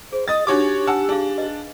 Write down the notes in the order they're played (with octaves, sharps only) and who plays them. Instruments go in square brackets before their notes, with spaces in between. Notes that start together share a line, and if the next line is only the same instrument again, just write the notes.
[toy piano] G#4 [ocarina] C5
[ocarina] D#5 [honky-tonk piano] D#6 A6
[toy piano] D4 D#4 C#6 [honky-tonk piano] F#4 C#5 D6 [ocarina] G4
[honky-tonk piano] F#5 A5 E6 [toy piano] G#5
[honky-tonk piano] D4 [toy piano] G#4 F5
[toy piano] B4 D#5